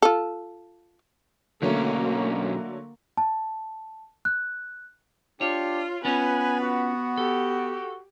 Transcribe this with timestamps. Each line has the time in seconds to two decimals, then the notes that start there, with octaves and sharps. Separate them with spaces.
0.02 F4 A4
1.62 B1 D3 F#3 A3 A#3 C#4
3.17 A5
4.25 F#6
5.41 D4 F4 G4 C#5
6.05 B3 C#4 F4 B4 C#5 G#5
6.61 F#4
7.18 G4 A4